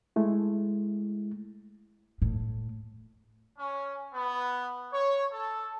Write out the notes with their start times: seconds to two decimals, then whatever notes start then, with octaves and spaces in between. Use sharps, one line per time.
0.16 G#3 A3 E4
2.22 A2
3.58 C#4
4.14 B3
4.93 C#5
5.32 A4